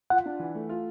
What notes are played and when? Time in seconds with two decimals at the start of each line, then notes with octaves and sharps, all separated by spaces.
0.10 F4 F#5
0.26 D4
0.40 E3
0.55 A3
0.69 F4